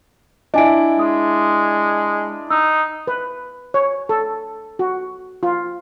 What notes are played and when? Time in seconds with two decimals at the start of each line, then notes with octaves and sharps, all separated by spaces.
0.54 D4 E4 D#5 G#5 D7
0.99 G#3 D#6
2.50 D#4 E6
3.07 B4
3.74 C#5
4.09 A4
4.79 F#4
5.43 F4